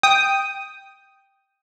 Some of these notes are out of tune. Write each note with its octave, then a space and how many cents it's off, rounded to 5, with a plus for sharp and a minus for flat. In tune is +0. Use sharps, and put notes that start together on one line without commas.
G5 +0 D#6 +0